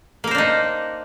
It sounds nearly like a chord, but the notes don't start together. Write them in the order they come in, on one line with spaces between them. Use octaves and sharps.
A#3 A#4 C5 D4 D#4